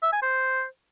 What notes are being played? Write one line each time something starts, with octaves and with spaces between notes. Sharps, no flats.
E5
G#5
C5